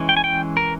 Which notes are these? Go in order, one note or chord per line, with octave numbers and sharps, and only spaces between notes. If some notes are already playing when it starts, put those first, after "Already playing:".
Already playing: E3 G#3 C#4
G5
G#5
G5
A#4